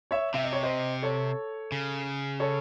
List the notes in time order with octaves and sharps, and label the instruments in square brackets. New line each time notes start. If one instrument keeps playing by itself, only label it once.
[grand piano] C#5 E5
[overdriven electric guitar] C3 [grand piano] E5
[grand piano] D#5
C#5
C5 D#5
A4 C#5
[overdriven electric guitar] C#3
[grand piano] A4 C#5